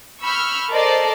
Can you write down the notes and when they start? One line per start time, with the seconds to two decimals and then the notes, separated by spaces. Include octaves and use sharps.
0.23 B5 C#6 E6 F6 G6
0.70 A4 A#4 C5 D5 D#5 A5